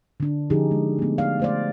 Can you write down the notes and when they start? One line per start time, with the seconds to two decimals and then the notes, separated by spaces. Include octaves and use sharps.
0.20 D3 D4
0.50 D3 F3 C#4 D#4 G4 G#4
0.71 G#3
0.98 A3 B3
1.18 D5 F5
1.40 A3 C5 D5